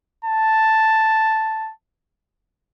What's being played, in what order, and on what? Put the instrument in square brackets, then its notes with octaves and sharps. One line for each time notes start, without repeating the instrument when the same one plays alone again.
[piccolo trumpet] A5